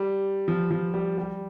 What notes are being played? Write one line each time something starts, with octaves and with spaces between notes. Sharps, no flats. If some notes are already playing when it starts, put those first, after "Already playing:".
Already playing: G3
F3
F3
G3
G3